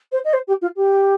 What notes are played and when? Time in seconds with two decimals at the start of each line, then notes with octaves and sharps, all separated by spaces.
0.12 C5
0.24 D#5
0.33 C5
0.47 G4
0.61 F4
0.76 G4